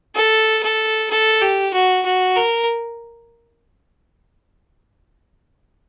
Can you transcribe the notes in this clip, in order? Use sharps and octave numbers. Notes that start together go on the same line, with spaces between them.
A4
A4
A4
G4
F#4
F#4
A#4